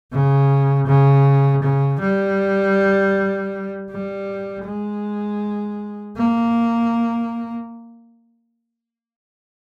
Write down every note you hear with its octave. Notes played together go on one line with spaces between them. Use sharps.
C#3
C#3
C#3
G3
G3
G#3
A#3